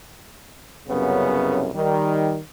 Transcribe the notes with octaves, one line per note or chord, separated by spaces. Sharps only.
C2 F#2 C#3 B3
D#3 G3